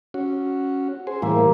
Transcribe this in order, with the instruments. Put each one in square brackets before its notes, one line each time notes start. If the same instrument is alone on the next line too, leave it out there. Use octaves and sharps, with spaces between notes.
[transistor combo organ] C#4 F#4
G#4 C5
[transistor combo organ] A2 E3 G3 [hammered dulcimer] A#3 E5